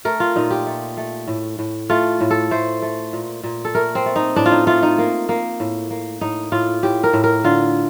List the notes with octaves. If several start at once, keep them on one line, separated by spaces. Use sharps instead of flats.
A3 A#4
F4
A#2 D#4
G4
A3
A3
A2
A2
A3 F4
A2
A4
A3 C5
A3
A#2
A#2
A4
A3 A#4
C4
A3
D#4
A2 D4
F4
D#4
A3 F4
D#4
A#3
A#3
A2
A#3
A2 D#4
A2 F4
A2 G4
A#4
A2
A#4
D3 F4